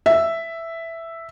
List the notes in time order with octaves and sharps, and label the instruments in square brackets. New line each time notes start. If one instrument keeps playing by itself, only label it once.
[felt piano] E5